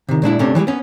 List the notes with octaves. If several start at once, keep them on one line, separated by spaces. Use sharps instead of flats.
C3 D#3
A#2 G#3 D4 E4
C3 A3 C#4 D4
E3 F3 G3 G#3
B3 C#4